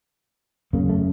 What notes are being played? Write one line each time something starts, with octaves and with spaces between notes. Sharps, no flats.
F#2 C#3 A#3
A3